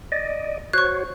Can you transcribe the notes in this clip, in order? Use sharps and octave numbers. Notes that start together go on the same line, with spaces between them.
D5 D#5
F#4 C5 C#5 C#6 F#6